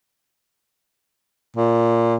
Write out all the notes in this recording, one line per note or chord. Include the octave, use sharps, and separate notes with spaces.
A#2